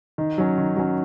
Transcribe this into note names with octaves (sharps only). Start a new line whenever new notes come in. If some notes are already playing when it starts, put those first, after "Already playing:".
D#3
F#3 C#4
D#3
F#3 C#4